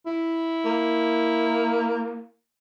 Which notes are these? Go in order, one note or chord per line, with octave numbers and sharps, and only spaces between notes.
E4
A#3